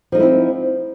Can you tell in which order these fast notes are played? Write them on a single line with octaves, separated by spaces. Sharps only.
F3 D#4 A3 E4 C4